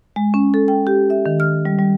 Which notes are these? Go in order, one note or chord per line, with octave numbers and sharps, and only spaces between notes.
G#3
C#4
A4
G5
G4
E5
D#3
F6
G3
G3